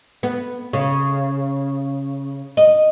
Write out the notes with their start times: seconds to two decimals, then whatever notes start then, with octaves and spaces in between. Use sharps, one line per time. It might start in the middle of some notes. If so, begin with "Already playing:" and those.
0.23 B3
0.73 C#3
2.57 D#5